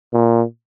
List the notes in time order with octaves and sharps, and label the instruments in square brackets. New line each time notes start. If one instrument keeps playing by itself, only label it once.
[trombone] A#2